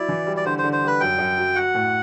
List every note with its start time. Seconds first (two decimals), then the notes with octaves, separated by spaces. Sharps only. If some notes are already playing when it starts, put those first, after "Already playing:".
Already playing: F#3 E4 D5
0.09 E3
0.26 G3
0.37 D5
0.45 D3 C5
0.58 C5
0.64 D3
0.73 C5
0.83 G3 B4
1.00 F#2 G5
1.18 F#2
1.38 F#3
1.56 F#4 F#5
1.74 A2